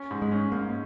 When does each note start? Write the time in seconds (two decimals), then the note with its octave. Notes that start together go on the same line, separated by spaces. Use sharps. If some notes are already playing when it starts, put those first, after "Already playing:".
Already playing: C#4
0.11 G#2
0.22 G#3
0.32 C#4
0.52 G#2 A#3